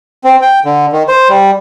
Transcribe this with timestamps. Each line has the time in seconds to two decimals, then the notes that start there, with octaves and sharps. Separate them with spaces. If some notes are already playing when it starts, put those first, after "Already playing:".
0.24 C4
0.42 G5
0.65 D3
0.92 D#3
1.08 C5
1.29 G3